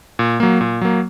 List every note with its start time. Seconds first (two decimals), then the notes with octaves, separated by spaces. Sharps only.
0.19 A#2
0.40 F#3 A#3
0.61 A#2
0.81 F#3 A#3